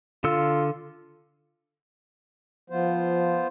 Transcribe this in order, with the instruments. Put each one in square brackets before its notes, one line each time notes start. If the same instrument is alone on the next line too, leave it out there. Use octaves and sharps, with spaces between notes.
[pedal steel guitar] D3 A4 E6 [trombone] F4
[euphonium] F3 [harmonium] B3 F4 C5